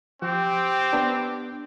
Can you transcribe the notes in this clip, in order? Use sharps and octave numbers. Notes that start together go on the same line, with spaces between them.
F3 C4 G4
B3 D4